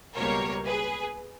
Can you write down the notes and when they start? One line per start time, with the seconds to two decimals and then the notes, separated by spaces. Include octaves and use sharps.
0.15 C#2 B2 G3 A#3 A#4 C#5
0.66 G#4 B4